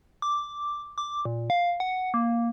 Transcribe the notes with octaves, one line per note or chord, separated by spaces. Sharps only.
D6
D6
A#2
F5
F#5
A#3